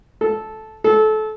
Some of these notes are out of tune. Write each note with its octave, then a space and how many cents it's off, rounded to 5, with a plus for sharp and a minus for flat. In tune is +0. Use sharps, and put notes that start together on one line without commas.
A4 -10
A4 -25